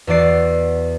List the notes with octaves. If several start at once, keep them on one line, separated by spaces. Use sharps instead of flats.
E2 F#4 D5 C7